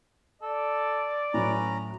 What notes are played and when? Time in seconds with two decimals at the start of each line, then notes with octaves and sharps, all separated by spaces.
0.42 A4 D5
1.34 A2 F#3 C#4 B4 A#5